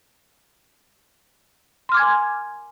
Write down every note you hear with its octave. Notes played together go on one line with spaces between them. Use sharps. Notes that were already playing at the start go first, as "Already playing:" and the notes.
G#5 C6 D6 F6 G#6